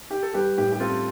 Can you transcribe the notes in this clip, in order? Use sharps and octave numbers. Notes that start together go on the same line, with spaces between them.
G4
A4
G3 G4 B4
A2 G4
G4
C4 F4 A4